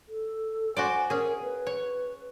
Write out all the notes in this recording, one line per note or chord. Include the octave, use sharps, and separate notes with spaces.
A4
F#4 C5 D5 G#5
C#4 G#4 A#4
B4
C#5